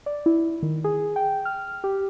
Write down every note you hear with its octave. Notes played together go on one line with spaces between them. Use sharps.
D5
E4
D#3
G#4
G5
F6
G4